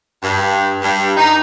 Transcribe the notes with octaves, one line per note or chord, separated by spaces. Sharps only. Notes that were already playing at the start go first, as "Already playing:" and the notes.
G2
G2
D#4